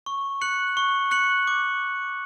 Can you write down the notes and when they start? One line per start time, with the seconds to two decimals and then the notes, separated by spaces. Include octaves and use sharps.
0.06 C#6
0.41 F#6 C#7 F#7
0.77 C#6
1.11 F#6 C#7 F#7
1.47 D6